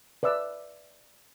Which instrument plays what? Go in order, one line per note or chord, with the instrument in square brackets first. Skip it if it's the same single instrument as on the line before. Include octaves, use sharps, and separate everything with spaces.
[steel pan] B4 D5 E5 E6